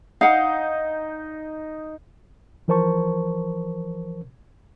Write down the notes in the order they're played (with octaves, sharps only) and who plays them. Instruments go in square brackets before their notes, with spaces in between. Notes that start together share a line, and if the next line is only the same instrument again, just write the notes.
[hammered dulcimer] D#4 [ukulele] F5 F#5
[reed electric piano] E3 F3 A#4 C5 A5 C#6